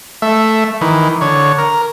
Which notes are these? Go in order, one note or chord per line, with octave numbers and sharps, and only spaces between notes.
A3 E5
D#3 E3
D3 C#5
A#4